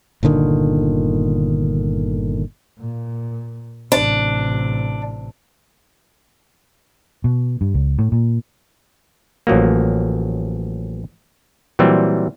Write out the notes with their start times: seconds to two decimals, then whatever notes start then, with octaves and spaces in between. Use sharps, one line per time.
0.23 G1 A#2 D3 D#3
2.79 A#2
3.92 A1 C3 D4
7.24 B2
7.61 G2
7.74 C#2
7.99 A2
8.12 A#2
9.47 A1 F3 F#3 A#3
11.79 A#2 E3 F#3 G3 C4